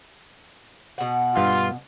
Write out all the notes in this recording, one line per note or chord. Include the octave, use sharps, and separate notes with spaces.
B2 F#5
G2 F4 F5